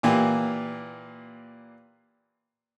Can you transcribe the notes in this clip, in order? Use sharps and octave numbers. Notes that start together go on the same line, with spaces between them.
A#2 E3 A#3 G4